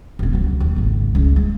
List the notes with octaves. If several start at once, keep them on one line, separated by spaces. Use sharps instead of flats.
D1 C3
C#2 F#3
D#2
G#1 C#2
C#2 G#3
G#3